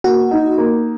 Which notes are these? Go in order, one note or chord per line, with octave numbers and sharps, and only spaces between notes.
A#3 F#4
D#4
A#3